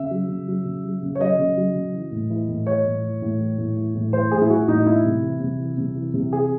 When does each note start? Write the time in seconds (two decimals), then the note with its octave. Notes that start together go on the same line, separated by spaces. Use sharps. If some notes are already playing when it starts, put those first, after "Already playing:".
Already playing: C#3 E5
0.11 F#3
0.29 C#3
0.48 F#3
0.66 C#3
0.85 F#3
1.03 C#3
1.15 C#5
1.21 F#3 D#5
1.39 C#3
1.57 F#3
1.75 C#3
1.94 E3
2.12 A2
2.30 E3
2.49 A2
2.66 E3 C#5
2.85 A2
3.04 E3
3.22 A2
3.40 E3
3.58 A2
3.76 E3
3.95 A2
4.13 E3 C5
4.31 A2 G#4
4.42 E4
4.50 E3 F#4
4.68 A2 D#4
4.86 E3 E4
5.05 C3
5.23 E3
5.41 C3
5.59 E3
5.78 C3
5.96 E3
6.14 C3
6.32 E3 G#4